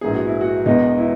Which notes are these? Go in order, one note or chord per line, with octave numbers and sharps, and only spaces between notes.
A#1 G#2 E3 A#3 G#4
F#4
E4
F#4
E1 E2 B2 G#3 B3 D#4
E4